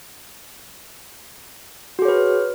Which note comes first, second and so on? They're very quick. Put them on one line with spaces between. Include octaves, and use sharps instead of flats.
F#4 G#4 C#5 B4